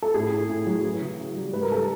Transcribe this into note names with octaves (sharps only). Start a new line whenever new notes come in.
A4
A2 G#4
A2
A2
F#3
E3
C#3
E3
G3
G#2 B4
A#4
G3 A4